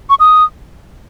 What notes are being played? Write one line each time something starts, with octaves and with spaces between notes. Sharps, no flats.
C#6
D#6